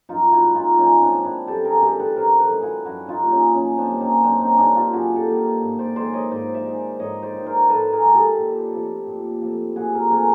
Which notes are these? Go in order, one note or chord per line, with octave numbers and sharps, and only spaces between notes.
F#2 D#4 F4
E4 F#4
D#3 G#3
D#4 F4
F#2 C#4 D#4
C4 D4
D#3 G#3
D4 E4
F#2 G4 A4
G#4 A#4
D#3 G#3 G4 A4
A4 B4
F#2 A#4 C5
A4 B4
D#3 G#3
E4 F#4
F#2 E4 F#4
D#4 F4
D#3 G3 A#3
C#4 D#4
F#2 C#4
C4 D4
D#3 G3 A#3
C#4 D#4
F#2 C4 D4
C#4 D#4
D#3 G3 A#3 D4 E4
F4 G4
F#2 F#4 G#4
G4 A4
D#3 G3 A#3
G#2
C5 D5
D#3 G#3 C5 D5
C#5 D#5
G#2 C5 D5
D5 E5
D#3 G#3
G#2 C#5 D#5
C5 D5
D#3 G#3
A#4 C5
G#2 A4 B4
G#4 A#4
D#3 G#3
G4 A4
A#2
F3 A3 C4
A#2
F3 A3 C4
A#2 F#4 G#4
G#4 A#4
F3 A3 C4 G#4 A#4